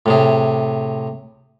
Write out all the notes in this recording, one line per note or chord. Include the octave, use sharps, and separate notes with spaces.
A2 C3 G#4